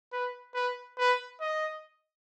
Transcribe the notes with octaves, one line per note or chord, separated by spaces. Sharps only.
B4
B4
B4
D#5